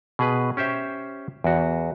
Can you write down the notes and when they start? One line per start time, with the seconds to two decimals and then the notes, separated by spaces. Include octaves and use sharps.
0.19 B2 G#4 B4
0.57 C#4 G4 C5 E5
1.44 E2 F#4